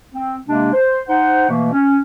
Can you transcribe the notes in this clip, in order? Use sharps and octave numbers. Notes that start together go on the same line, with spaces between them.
C4
C3 G#3 A#3 D4
C5
D#4 C5 F#5
B2 E3 A3 A#3
C#4